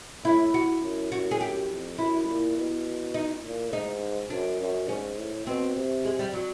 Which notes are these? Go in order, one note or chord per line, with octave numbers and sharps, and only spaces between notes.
A2 E4
F#4
F#2
F#2 F#4
G#4
G4
F2
F#2 E4
A#2
B2
D#4
A#2
G#2 D#4
F#2 D4
F#2
G#2 C#4
A2
B2 C4
C3
G#3
G3
F#3